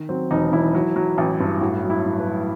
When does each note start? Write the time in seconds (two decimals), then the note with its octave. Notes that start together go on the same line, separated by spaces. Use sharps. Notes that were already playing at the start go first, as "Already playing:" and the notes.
Already playing: D#3
0.09 F#3 C4
0.31 E1 D#4
0.52 E1 E4
0.74 F#3
0.96 F#3
1.18 A1
1.40 G2
1.61 A2 F#4
1.84 F#3
1.90 E4
2.05 A2
2.20 B4
2.27 F#3